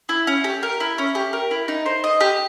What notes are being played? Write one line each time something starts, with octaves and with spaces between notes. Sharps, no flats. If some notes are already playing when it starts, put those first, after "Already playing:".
E4
C#4
G4
A#4
E4
C#4
G4
A#4
E4
D#4
C5
D#5
G4